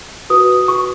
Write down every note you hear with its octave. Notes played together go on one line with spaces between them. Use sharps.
F#4 B4 D#6
C#6